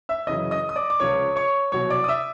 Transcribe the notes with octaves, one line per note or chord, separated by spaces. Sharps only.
E5 E6
F#2 C#3 E3 D#5 D#6
D#5 D#6
D#6
D5 D6
D6
C#2 C#3 F3 C#5 C#6
C#5 C#6
C2 B2 F#3 C#5 C#6
D5 D6
D#6
E5 E6